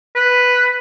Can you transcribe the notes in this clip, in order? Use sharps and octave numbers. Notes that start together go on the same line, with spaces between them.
B4